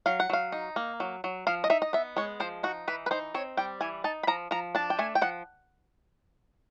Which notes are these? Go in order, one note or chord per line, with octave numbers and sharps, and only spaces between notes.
F#3 F5
F#5
F#3 F5
D#4
A#3
F#3
F#3
F3 F5
D#5
D#4 E5
D#5
B3 E5
G#3 C#5
F3 C5
D#4 F#4
E3 B4
B4
D#4 C5
C4 C#5
G3 G5
E3 G#5
D#4 A5
B5
F3 A#5
F3 A#5
D4 A5
G5
A3 G#5
G5
F3 F#5